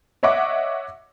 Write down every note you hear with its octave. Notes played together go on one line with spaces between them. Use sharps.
C#5 D#5 E5 F#5 D6